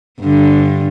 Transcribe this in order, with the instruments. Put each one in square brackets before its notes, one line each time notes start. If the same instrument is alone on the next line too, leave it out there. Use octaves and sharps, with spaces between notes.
[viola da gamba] G2 D3